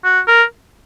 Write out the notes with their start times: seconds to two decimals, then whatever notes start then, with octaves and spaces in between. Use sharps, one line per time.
0.04 F#4
0.27 A#4